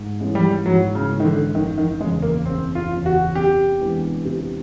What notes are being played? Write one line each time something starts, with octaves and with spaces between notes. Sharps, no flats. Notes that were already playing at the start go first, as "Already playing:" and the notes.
Already playing: G#2
E3 G#3 C#4 E4
G3
G#2 F#3
C#3
E3 G#3 C#4 E4
D#3
D3
F#1 D#3
D#3
E2 C#3 G#3
A#3
F#1 C4
F4
E2 C#3
F#4
C3 G4
E3 G#3 B3 D4
C3